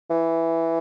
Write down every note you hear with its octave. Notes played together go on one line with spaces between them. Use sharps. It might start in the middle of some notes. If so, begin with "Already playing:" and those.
E3